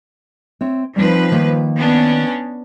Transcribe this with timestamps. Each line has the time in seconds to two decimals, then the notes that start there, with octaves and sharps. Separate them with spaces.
0.61 C4 C#5 E5
0.96 F3 G3 C4 D#4 B4
1.32 D#3 A#3 C5
1.77 B3 C#4 D4